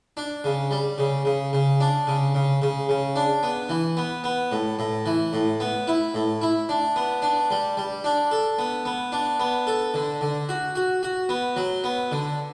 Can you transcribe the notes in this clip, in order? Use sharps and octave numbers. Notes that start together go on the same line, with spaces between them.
D4
C#3
G3
C#3
C#3
C#3
D4
C#3
C#3
C#3
C#3
D4
B3
E3
B3
B3
A2
A2
E3
A2
B3
E4
A2
E4
D4
B3
D4
G3
G3
D4
A4
B3
B3
D4
B3
A4
D3
D3
F#4
F#4
F#4
B3
F#3
B3
D3